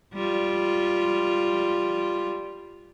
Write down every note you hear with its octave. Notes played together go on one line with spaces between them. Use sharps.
G3 F4